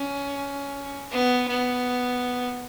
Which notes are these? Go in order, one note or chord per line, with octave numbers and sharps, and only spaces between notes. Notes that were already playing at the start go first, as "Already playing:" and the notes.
Already playing: C#4
B3
B3